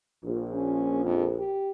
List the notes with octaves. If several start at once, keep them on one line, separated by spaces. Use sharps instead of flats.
A#1
C#4
F2
G4